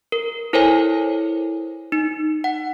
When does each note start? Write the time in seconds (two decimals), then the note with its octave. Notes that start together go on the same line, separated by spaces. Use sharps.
0.12 A#4
0.53 E4 A4 A#4 C5 C#5 G#5
1.92 D#4
2.44 F#5